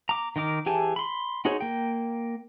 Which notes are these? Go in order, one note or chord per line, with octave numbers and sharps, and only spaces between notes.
A#5 D6
D#3 D#4 A#4 D6
E3 G4 G#4 G#5 A5
B5 C6
D#4 F#4 G#4 C5 C#5
A#3 G5